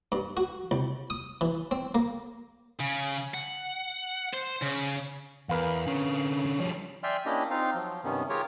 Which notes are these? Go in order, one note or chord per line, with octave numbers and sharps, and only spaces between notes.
G2
F#4
C2
D#6
E3
C4
A#3
C#3
F#5
C5
C#3
E2 A#4 B4 F5
D3 C#4
F3 G3 C#5
D5 E5 G5 G#5 C6 F6
A#3 C#4 D4 E4 G4 D#5
C4 D#4 F4 F5
F3 F#3
G2 C3 D#3 B3 C#4
F4 G4 G#4 A#4 C#5